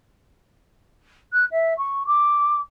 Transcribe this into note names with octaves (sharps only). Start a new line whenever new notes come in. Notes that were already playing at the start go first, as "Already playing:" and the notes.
F#6
E5
C#6
D6